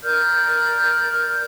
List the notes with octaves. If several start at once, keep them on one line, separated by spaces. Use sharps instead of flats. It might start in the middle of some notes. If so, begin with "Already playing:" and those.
A#4 D5 F6 G6